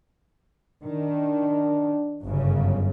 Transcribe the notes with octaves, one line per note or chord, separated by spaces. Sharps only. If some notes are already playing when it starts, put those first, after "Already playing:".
D#3 D4
G1 F#2 C#3